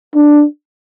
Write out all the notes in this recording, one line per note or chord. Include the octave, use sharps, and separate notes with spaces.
D4